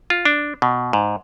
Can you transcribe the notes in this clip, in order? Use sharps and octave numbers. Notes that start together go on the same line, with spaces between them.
F4
D4
B2
G#2